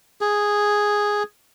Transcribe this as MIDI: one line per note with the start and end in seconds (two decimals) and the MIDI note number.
0.21 1.23 68